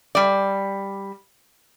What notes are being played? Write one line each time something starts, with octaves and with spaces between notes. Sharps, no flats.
G3 D5